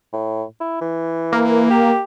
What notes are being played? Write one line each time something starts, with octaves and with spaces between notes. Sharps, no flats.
A2
E4
E3
A#3
G4